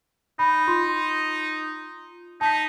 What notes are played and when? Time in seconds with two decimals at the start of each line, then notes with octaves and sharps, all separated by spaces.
0.39 D#4 B5
0.68 F4 C6
2.41 D#4 A5 D#6 B6